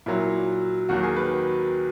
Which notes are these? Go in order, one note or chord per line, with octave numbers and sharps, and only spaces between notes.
A#2 F#3 E4
D#2 D#3 F#3 F#4
G#4
B4